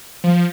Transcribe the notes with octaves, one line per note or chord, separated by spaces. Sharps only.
F3